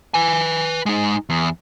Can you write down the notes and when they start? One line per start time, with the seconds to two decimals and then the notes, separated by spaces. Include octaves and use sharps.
0.14 B4 G#5
0.86 G#3 D#4
1.30 E2